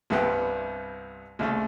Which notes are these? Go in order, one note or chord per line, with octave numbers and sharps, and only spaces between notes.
C2 G2 C3 B3 F#5 G5
C2 C#3 A3